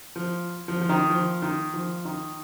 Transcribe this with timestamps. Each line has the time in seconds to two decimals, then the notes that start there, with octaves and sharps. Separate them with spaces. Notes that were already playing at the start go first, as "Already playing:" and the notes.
0.16 F3
0.68 F3
0.81 F3
0.89 D#3
1.10 F3
1.42 D#3
1.74 F3
2.05 D#3